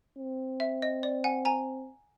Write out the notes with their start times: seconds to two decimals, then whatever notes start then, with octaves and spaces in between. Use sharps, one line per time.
0.18 C4
0.60 E5
0.82 D#5
1.03 D5
1.24 F#5 G#5
1.45 G#5 A#5